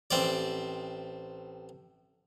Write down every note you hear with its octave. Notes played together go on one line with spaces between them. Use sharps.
A1 C4 D5